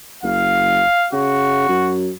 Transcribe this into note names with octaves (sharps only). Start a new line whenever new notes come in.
F#1 F5
C#3 F#4
F#2